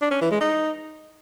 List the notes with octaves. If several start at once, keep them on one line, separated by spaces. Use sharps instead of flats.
D4
C#4
E3
G#3
D#4